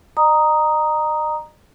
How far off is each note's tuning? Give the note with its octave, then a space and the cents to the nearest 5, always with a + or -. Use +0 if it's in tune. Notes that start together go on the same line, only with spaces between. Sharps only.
D#5 -45 A#5 +0 D#6 +0